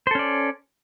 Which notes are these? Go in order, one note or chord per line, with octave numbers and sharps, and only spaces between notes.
C#4 A4 C5 D5